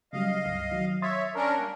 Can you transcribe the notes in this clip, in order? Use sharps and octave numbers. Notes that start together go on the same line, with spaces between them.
C#3 F#3 G3 D#5 F5
C#2 G2
D#3 F#3
C#5 E5 C6 D#6 A6
C#4 D4 A#4 A#5
G3 A#3